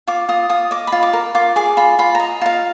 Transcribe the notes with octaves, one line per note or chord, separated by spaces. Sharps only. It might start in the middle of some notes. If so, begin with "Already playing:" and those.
F4 D6
F4 D#6
F4 D#6
D#5 D6
B5
F4
D6
A#4
F4 D6
G#4 D6
F4 B5
F4 B5
D#5 A#5
F4 F5